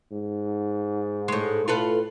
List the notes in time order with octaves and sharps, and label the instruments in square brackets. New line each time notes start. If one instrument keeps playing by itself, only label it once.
[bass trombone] G#2
[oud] A2 G#3
[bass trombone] A2 [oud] F4 A4 B4